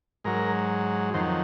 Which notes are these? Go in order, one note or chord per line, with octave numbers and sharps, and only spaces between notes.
G#2 F#3 A#4
F2 D#3 F#3 C5